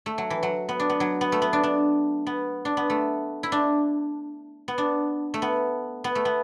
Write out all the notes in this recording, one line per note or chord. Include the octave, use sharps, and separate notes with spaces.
A3
F#3
E3
F#3
B3
D4
B3
F#3
B3
A3
B3
D4
D4
B3
D4
B3
A3
E4
D4
B3
D4
A3
B3
B3
A3
B3